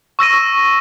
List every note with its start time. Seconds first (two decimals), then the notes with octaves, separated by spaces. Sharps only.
0.19 C#6 E6 A#6 D#7